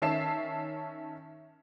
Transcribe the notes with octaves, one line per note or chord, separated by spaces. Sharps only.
D#3 C#4 E5 A5 C7 E7